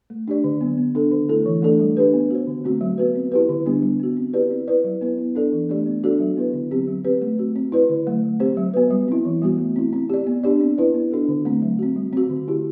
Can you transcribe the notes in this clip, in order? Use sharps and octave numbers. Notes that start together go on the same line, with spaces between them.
A3
D4 G4 D5
D3
F#3 B3
B3
D4 A4
D3
A3 E4 A4
E3
A3 D4 A4 D5
G3
D4 G4 B4
B3
F#4 C5
D3
A3 C4 F#4
F#3
B3 F#4 B4
C4
E4 G4 B4
D3
G3 B3 D4 G4
G3
B3 F#4
C4
E4 G4 B4 D5
C4
E4 B4 D5
F#3
B3 E4 B4
B3
D4 A4 D5
E3
A3 D4 G4 D5
B3
D4 F#4 A4 D5
F#3
B3 E4 B4
D3
F#3 C4 G4
F#3
C4 G4 B4
A3
C4 F#4
C4
E4 B4 D5
D3
F#3 A3
F#3
C4 G4 C5
F#3
B3 F#4 B4
G3
C4 E4
E3
G3 B3 F#4
A3
C4 E4
C4
G4 D5
B3
D4 G4 D5
C4
E4 B4 D5
B3
D4 F#4 A4
D3
A3 C4
F#3
C4 F#4
G3
C4 F#4
D3
A3 E4 G4